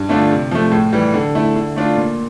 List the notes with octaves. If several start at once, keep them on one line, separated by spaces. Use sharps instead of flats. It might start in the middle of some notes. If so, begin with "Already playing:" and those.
Already playing: G2
D3 A3 D4 F4
C3
F3 A3
A2
E3 G3
D3
A3 E4
D3
A3 D4 F4
A#2